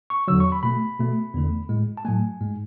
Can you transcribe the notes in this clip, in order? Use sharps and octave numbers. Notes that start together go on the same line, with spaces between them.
C#6
E2 D3 F#3 E6
C#6
B5
B2 A3 B5
B2 A3
E2 D3 A3
A2 G#3
A5
A2 F#3 A3 G#5
G#2 G#3